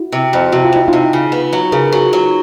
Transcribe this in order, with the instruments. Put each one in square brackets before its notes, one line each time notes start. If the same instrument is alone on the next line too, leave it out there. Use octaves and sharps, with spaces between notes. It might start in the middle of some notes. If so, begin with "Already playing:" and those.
Already playing: [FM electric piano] E4 F#4
[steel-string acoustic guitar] C3
F2
[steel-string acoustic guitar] C3 [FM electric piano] F#4
[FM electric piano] F4
[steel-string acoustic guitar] F2 [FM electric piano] E4
[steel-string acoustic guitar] C3 [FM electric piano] D#4 F4
[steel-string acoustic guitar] C#3
B3
F#3
[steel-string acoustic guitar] C#3 [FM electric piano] G#4 A#4
[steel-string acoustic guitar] F#3
F#3